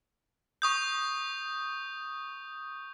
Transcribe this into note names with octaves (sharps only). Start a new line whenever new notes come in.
C#6 D#6 G6